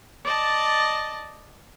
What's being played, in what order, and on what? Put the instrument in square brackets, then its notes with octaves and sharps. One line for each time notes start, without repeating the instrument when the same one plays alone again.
[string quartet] D5 D#5 A5